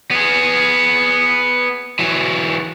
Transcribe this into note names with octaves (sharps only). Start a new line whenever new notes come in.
B3 G#4
E3 F#3